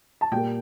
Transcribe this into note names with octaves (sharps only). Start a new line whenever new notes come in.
A5
A#2 G3 A#3 G5